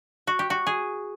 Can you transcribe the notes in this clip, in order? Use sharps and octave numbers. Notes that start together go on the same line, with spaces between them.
F#4
G4
F#4
G#4